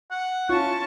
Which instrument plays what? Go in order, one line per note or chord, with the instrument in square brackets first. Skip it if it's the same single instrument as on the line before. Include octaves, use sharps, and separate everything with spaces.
[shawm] F#5
[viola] C#4 A5 [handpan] E4 F4 [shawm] C#6